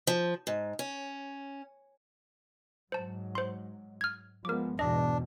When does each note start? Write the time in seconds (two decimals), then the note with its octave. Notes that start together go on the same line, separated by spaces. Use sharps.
0.07 F3
0.47 G#2
0.79 C#4
2.92 G#2 F#3 C5 A5
3.35 C5 C6
4.01 F6 G#6
4.45 F3 G#3 B3 A#4 D6
4.79 E2 G#2 B2 D4 D#5